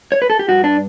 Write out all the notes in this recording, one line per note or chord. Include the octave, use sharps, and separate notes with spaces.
C#5
B4
A4
G4
G2 F#4
D4